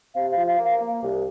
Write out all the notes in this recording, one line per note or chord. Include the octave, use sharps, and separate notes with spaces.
C3 F5
F5
F3
F5
A#3
F5
A#3
C2